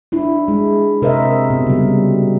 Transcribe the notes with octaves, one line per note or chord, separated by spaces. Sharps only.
D4 E4
G#3
C3 A#4 C5 D#5 E5
B2
C#3 G3